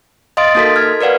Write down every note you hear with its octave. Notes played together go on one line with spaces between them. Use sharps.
D#5 F5 C6 D#6 A6 D7
A#3 D#4 F#4 A4 A#4 B6
F6 G#6
A#4 B4 D5 F5 F#5